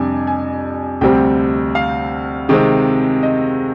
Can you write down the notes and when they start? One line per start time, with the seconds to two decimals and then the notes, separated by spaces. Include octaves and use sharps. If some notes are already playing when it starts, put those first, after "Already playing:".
Already playing: F2 C3 G3 D4 G#5
0.27 G#5
1.01 D2 C3 G3 C4 G5
1.75 F5
2.49 C3 D#3 G#3 C4
3.23 D#5